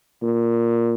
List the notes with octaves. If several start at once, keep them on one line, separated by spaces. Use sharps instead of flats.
A#2